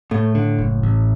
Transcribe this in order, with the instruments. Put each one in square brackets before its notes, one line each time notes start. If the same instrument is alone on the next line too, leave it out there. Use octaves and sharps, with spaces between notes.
[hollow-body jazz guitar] A2 [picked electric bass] A3
[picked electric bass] D3
F#1
A1